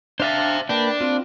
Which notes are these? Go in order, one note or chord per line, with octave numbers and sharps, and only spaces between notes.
D4 C5 E5 F5 A5
A#3 D4 B4 G5
C4 F4